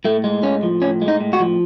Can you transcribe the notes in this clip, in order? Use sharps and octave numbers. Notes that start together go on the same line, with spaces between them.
A2 A3
G#3
A2 C#4
F3
A2 C#4
G#3
D#4
A2
F#4
F3